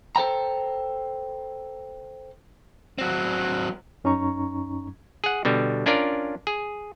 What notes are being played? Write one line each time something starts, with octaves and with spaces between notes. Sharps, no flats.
A4 C5 G5 A#5
F#3 C4
F#2 C#4 D#4 A#5 C#6
G#4 F#5
B2 D3 G3
C#4 D4 F4 A#4 D5
G#4